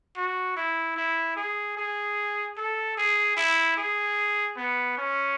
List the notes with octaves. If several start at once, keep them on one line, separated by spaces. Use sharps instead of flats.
F#4
E4
E4
G#4
G#4
A4
G#4
E4
G#4
B3
C#4